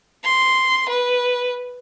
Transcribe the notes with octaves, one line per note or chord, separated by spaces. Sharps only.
C6
B4